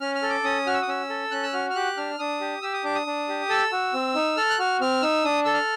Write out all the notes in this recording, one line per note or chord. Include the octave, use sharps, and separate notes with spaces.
C#4 F6
F6
A4
D6
C#4 D#6
F#4 F6
E6
D#6
C#4 E6
A4
C#4 F#6
E6
F#4 F6
F6
G4 F#6
D4 F6
D4 D#6
G4
G4 E6
D#6
D4 D6
D#6
D4
G4
A4 E6
F#4
C4
D#4
A4 F6
F#6
F#4 F6
C4 F6
D#4 E6
D4 D#6
A4 E6
F6